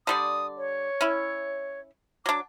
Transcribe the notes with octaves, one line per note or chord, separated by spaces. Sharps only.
D3 G3 D5 D#6
C#5
C#4 E4
F#3 D4 D6